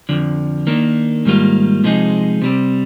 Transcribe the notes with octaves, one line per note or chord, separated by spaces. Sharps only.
F2 D3 F3
D#3 A#3 D4
G#2 D#3 G3 A#3 F4
C3 F3 G#3 D#4 G#4
C3 G3 C4